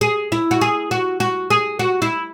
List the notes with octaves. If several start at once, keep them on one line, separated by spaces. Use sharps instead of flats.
G#4
E4
F#4
G#4
F#4
F#4
G#4
F#4
E4